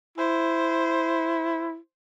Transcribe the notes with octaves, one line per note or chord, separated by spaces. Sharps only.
E4 C5